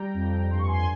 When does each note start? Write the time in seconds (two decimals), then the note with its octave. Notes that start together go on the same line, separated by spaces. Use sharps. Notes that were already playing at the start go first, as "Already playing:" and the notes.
Already playing: G3 G5 A#5
0.14 F2
0.51 G2 C6
0.59 C#6
0.67 G#5 C6